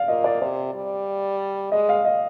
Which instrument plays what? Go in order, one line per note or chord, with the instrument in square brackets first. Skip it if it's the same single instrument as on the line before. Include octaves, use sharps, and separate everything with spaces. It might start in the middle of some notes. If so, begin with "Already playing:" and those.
Already playing: [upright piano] D5 F5
[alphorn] A#2 [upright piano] D#5
[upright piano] D5
[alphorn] C3 [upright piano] D5
[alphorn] G3
[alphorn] G#3 [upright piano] D#5
[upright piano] F5
D#5